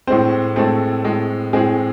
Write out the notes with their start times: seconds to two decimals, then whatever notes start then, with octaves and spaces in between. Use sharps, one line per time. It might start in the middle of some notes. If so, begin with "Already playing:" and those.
0.07 A2 G#3 C4 C5
0.56 A2 G#3 A3 C4 A4
1.04 A2 G#3 C4
1.53 A2 G#3 C4 G#4